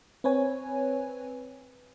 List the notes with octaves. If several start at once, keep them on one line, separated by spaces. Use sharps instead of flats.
C4 B4 C#5 G#5